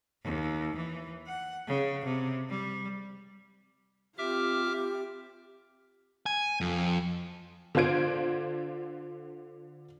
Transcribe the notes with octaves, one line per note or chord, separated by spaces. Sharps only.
D#2
E3
F#5
C#3
C3
G3
C4 F4 G4 E5 D6 F6
G4
G#5
F2
D3 D4 F4 C5 G#6 D7